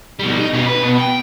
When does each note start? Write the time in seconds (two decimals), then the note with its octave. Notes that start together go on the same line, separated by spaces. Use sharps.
0.19 B2 G3
0.39 D#4
0.53 B2 C#4
0.66 B4
0.83 B2
0.98 G5